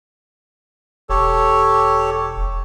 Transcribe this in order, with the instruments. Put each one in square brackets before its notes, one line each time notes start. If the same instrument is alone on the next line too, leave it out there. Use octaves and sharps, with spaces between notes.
[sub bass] E1 [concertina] G4 A4 C#5